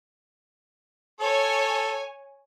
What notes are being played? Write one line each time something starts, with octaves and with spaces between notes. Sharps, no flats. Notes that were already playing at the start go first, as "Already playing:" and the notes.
A4 C#5 G#5